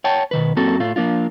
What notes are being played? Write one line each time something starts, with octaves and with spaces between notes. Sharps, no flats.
C#5 F#5 G5 A5
B2 D#3 B4
F#2 A#3 C4 F#4 A4
A2 A3 F4
F3 A#3 D4 F4